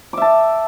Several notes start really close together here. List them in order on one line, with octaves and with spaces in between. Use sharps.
D6 E5 A5